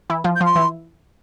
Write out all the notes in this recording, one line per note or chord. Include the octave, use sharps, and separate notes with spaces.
E3 E4
F3 F4
G6
F3 F4
C6
E3 E4